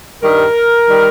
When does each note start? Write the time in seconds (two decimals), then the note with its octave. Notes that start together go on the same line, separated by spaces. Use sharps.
0.22 G2 D#3 G3 A#4
0.88 D#3 G3